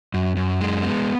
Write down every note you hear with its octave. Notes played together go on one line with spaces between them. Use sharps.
F#2
F#2
G#3
B3